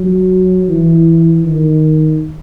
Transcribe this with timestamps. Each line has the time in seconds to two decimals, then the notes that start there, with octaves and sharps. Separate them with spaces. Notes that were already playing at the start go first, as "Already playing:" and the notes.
Already playing: F#3
0.69 E3
1.45 D#3